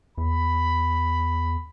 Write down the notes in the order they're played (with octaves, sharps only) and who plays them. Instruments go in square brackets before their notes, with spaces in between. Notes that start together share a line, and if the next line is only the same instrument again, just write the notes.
[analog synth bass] E2 [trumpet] B5